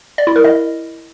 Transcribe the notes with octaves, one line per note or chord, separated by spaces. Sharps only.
D5
E4
A#4
D#5